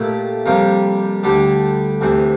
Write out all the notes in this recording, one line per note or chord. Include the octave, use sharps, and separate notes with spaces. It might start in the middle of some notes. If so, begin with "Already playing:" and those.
Already playing: A#2 A3 E4 G4
F2 C3 G3 A#3
D2 D3 G3 D4 G4
D2 C3 E3